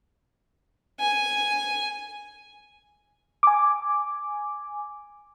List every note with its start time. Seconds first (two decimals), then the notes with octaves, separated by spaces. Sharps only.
1.00 G#5
3.43 G#5 D6